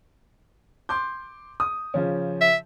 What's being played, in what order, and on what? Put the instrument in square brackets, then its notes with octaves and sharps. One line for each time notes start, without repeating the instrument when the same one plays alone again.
[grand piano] C6 D6 G6
D#6
C#3 F3 C#4
[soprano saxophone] E5